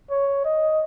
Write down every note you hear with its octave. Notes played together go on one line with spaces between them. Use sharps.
C#5
D#5